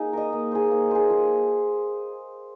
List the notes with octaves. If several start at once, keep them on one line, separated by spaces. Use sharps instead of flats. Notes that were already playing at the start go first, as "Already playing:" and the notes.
Already playing: A#3 D#4 G#4
A#4 D#5
A#3
G#4 C5
A#3
G#4 C5
F3